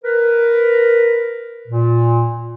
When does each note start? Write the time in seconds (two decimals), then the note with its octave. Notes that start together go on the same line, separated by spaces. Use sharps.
0.04 A#4 B4
1.68 A#2